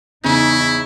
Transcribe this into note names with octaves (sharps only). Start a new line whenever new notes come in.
E2 C#3 D#4 E4